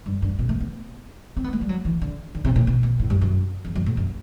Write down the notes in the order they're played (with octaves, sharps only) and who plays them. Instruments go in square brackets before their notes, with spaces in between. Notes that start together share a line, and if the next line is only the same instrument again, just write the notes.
[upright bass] G2
G2
B2
A3
B3
C4
B3
A3
G3
F#3
E3
D3
D3
C3
A2
B2
B2
A2
G2
F#2
E2
F#2
A2
F#2